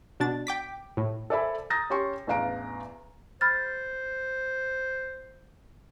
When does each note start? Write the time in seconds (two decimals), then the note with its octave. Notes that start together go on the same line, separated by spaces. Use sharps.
0.20 B2 D4 A6
0.47 G5 D6 B6
0.97 A2
1.30 A4 C5 D5 E5 G#5 B5
1.70 A#5 D#6 G6 A6 A#6
1.90 C#4 G4 G5 C6 C#6
2.27 A1 E2 D4 F5 A#5 D7
3.41 C5 B5 F6 A6